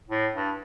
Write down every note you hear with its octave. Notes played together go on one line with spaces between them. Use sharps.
A2
G2